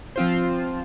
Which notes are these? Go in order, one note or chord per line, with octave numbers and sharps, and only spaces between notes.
F3 C4 F4 C5